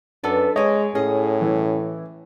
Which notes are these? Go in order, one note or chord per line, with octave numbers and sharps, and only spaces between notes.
F#2 B3 D4 A4 B4 D5
G#3 D4 C#5 D#5 G#5
A2 C#4 G#4 D#5
E3 E4